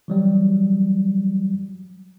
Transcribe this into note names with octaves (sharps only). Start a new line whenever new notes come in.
E3 F#3 G3